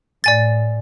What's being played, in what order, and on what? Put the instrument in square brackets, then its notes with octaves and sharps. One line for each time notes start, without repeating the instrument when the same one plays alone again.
[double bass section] A2 [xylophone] D5 G#5 A6